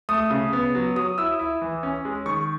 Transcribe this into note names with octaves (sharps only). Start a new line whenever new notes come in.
A3 D#6
C#3
B3
F#3
F#3 D#6
E4 E6
E4
E3
C#4
G#3
D#3 C#6